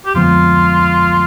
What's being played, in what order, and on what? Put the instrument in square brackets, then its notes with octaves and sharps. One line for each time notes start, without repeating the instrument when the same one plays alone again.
[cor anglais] G4
[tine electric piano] F2 D3 F3 G#3 B3 [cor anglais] F4